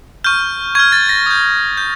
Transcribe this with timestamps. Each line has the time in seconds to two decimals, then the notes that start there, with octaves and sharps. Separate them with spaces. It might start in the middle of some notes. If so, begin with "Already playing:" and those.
0.24 C#6 F6 G6
0.75 C#6 F6 G#6
0.92 A6
1.09 A#6
1.26 D#6 G6
1.77 G6